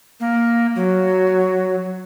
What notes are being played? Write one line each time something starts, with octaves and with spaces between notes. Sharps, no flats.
A#3
F#3